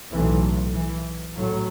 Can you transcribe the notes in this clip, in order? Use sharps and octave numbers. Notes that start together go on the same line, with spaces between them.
B1 A2 E3
E3
A1 A2 F#3